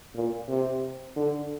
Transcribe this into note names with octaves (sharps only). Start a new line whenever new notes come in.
A#2
C3
D3